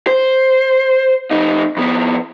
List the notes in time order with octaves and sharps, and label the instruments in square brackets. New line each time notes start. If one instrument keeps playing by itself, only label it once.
[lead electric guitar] C5
F2 D#4
F2 B3